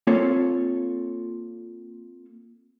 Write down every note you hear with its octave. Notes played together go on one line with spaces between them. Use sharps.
A#3 C4 F4 A4 C#5